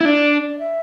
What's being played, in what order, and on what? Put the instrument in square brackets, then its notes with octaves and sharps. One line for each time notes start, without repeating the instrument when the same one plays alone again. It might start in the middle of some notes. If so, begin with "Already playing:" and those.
[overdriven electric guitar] E4
[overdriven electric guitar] D4 [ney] D5
[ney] E5